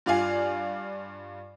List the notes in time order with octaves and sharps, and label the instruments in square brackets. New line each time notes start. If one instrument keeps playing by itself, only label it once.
[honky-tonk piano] G2 F4 D5 F5 G#5